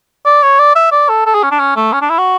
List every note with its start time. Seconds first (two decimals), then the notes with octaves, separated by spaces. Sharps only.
0.26 D5
0.43 C#5
0.59 D5
0.76 E5
0.92 D5
1.09 A4
1.26 A4
1.35 G#4
1.43 C#4
1.51 D4
1.59 C#4
1.76 A3
1.93 C#4
2.01 D4
2.10 E4
2.18 F#4